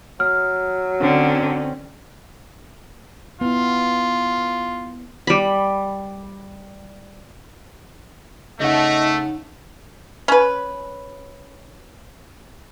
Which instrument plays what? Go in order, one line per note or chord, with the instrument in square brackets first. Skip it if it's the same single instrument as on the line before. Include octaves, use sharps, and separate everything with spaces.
[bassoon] F#3 [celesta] F6
[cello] D3 [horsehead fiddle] C4 C#4
[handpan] B3 E4 [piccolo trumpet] F4
[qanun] G3 B5
[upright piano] C#3 F#5 [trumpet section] A3 [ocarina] D#4 [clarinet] D#5
[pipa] C#4 B4